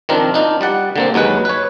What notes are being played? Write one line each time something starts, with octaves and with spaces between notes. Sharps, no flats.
D#3 F3 C4 D4 A#4
D4 D#4 F4
G3 D5 F#5
D3 A#3 C4
D#2 F#3 G#3 B4
B4 C#5